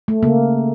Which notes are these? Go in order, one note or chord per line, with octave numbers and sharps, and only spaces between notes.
A3
C#3 A#3